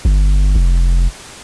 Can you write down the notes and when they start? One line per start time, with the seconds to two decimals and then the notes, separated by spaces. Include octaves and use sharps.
0.05 G1
0.55 F1